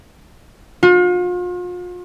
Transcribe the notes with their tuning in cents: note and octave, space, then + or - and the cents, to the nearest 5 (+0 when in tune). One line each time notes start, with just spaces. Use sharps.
F4 +40